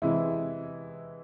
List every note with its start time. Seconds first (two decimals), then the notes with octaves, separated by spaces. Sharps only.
0.02 C3 E3 G#3 E4